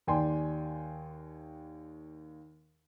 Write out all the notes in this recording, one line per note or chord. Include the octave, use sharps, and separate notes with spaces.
D#2 D5 G5 G#5 C6